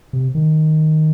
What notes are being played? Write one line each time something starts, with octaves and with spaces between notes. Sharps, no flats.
C3
D#3